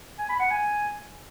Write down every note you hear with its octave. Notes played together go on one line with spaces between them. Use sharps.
G#5
B5
F#5
G#5